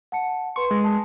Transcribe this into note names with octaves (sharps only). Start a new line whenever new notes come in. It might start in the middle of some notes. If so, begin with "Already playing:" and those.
F#5 A5 C#7
B4 C6 C#6
G#3
A5